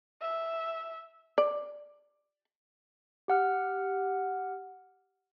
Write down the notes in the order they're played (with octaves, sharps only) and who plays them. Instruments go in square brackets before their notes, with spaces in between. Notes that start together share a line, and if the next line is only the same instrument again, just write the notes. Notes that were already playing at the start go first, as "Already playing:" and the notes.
[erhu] E5
[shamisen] D5
[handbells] G4 F#5 F6